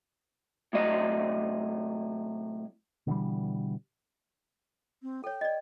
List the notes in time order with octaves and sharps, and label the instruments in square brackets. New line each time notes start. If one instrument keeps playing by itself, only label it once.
[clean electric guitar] A2 C3 F#3 D#5
[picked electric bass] B2 D3 E3 G3
[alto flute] C4
[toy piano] A4 C#5 [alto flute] G5
[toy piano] D5 D#5